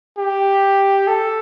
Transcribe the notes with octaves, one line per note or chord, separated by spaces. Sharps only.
G4
A4